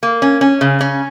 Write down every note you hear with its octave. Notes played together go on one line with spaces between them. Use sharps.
A#3
C#4
C#4
C#3
C#4